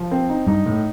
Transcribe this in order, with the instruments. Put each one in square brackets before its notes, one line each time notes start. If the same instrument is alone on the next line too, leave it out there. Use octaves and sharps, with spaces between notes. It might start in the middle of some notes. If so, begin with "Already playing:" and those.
Already playing: [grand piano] F3
C4
D#4
[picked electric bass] G2 [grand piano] D#4
[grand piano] A2